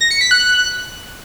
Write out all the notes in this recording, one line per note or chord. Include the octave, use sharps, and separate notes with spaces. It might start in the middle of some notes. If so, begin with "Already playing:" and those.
A#6
C#7
B6
F#6